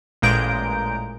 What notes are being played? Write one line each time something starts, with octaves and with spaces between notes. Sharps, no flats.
A1 A#2 G#3 A#5 G6 D7